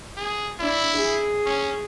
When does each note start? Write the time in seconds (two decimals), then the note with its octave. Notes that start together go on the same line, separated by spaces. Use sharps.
0.17 G#4
0.60 D4 E4
0.97 G#4
1.46 C#4